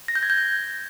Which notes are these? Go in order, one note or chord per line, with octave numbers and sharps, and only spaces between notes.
A#6
G6
G#6
G6